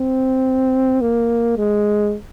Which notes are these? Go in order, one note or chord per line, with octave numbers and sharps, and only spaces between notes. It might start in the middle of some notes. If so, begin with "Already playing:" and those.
Already playing: C4
A#3
G#3